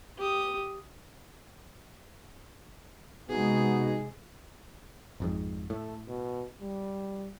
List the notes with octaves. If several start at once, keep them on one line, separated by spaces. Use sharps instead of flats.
G4 D#6
C3 G#3 B3 D#4 F#4 G#4
G#1 F2 G#2
A2 A3
B2
G3